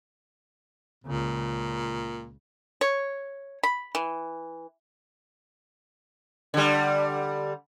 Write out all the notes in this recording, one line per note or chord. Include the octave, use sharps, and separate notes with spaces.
C#2 A#2 C#3
C#5
B5
E3
D3 G3